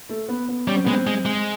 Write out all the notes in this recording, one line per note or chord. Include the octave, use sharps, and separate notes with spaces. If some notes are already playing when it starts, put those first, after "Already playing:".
A3
B3
B3
G3 C#4
C4
G#3 B3
C4
G#3
G#3